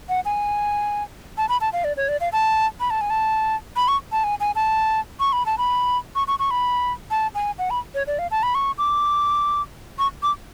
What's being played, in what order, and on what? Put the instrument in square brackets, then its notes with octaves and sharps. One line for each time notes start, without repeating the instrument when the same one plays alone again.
[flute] F#5
G#5
A5
B5
A5
F5
D5
C#5
D5
F5
A5
B5
A5
G#5
A5
B5
C#6
A5
G#5
G#5
A5
C#6
B5
A5
B5
C#6
C#6
C#6
B5
A5
G#5
F#5
B5
C#5
D5
F5
A5
B5
C#6
D6
C#6
D6